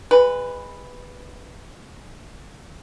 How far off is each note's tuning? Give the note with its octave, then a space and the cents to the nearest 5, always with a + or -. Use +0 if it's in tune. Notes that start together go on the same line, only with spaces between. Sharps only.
G#3 -30 B4 +0